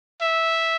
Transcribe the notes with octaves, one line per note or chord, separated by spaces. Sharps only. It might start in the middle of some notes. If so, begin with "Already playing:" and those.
E5